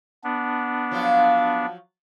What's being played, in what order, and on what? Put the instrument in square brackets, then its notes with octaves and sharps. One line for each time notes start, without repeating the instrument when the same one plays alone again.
[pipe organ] B3 D4
[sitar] F3 F#3 F4